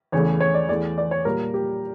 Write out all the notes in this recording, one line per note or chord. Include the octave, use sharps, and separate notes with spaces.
E2 C#3 E3 A3 C#5
C#5
D5
E2 E3 A3 D5
D5
C#5
A#2 G3 A#3 A#4
G4